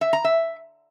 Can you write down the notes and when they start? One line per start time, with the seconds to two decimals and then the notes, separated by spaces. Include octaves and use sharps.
0.01 E5
0.13 A#5
0.24 E5